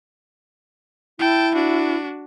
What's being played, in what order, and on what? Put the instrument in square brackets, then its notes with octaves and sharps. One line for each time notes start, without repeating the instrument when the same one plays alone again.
[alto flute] E4 [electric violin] G5 A5
[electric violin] D4 F#4